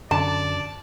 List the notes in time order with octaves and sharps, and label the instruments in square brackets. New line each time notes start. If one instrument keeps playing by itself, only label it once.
[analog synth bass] F#2 [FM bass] D3 [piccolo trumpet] D5 [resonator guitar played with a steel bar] A5